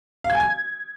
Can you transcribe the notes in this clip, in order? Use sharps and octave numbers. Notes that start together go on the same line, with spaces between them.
F5
G#6
G#5
G#6